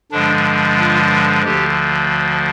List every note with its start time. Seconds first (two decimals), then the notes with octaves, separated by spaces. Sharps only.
0.12 G2 D3 F3 G#3 D4
0.79 F4
1.45 D2 D3 F3 G4